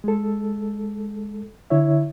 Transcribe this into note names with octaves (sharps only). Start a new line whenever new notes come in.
G#3 A4
D3 E4 C#5 E5